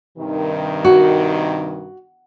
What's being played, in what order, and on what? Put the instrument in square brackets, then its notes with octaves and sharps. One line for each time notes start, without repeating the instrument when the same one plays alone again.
[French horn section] G2 C3 D#3
[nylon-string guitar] F#4